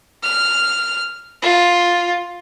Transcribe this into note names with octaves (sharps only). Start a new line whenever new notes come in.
F6
F4